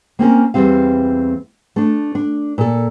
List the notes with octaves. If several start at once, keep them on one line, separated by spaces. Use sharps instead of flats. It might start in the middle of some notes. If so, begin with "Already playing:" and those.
A#3 C4 C#4 A#4
E2 E3 G3 C4 F5
A3 D4
D4
A#2 A4